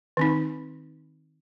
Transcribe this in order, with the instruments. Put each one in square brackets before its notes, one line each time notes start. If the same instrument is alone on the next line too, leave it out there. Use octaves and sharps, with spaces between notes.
[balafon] D#3 C4 D#4